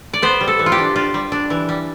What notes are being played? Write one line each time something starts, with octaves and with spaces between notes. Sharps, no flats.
D5
B3 C5
G3
A4
E3
F4
G4
D4
D4 F4
G3
D4
E3
G3